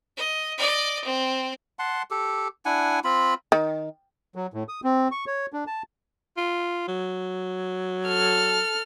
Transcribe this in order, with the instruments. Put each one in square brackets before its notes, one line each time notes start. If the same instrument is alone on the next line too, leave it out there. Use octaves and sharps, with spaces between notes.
[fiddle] D#5
D5 D#5
C4
[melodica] F#5 A5 C6
G4 A4
D4 E4 F#5 G#5
C4 F4 B5
[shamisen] D#3
[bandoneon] F#3
A2
D#6
C4
C#6
C#5
D4
A5
[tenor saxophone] F4
F#3
[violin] A4 F6